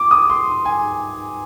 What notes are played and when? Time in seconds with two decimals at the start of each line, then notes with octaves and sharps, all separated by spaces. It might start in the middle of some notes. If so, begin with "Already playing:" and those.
Already playing: D6
0.11 D#6
0.30 C6
0.65 G#5